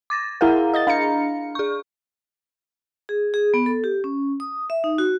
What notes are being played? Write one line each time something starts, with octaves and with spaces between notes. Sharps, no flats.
D6 A6 A#6
E4 G#4 A#4 F5 F#5 A#5
D#5 G6 A6
D4 F5 A#5 C#7
G#4 C#6
G#4
G#4
B3
A4
G4
C#4
D#6
E5
D#4
F#4